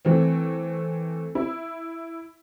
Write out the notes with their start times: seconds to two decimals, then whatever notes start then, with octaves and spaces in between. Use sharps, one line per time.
0.05 E3 A3 C4
1.35 E4